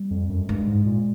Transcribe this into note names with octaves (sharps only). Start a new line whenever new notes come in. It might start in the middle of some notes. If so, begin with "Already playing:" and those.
Already playing: G3
F2
F#2
G2 G#3
G#2
A#2